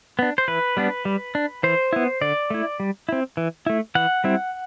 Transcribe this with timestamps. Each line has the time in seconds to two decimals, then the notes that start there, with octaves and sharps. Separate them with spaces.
0.19 B3 D4
0.38 C5
0.48 E3 B4
0.77 G3 B3 D4
1.05 G3
1.35 D4
1.63 E3 C5
1.93 B3 E4
2.21 D3 D5
2.50 A3 E4
2.80 G3
3.09 C4 E4
3.37 E3
3.66 A3 E4
3.95 E3 F#5
4.24 G3 C4 E4